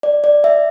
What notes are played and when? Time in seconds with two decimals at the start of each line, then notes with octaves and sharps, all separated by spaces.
0.03 D5
0.24 D5
0.44 E5